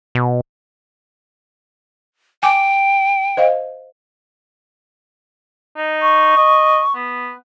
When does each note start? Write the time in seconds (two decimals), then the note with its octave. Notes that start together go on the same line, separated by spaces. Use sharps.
0.15 B2
2.43 G5 G#5 D6
3.37 C5 D#5 F5
5.77 D#4
6.02 C#6
6.36 D#5
6.95 B3